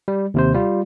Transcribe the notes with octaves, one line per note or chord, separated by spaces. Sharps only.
G3
D#2 C3 C5
G3 F4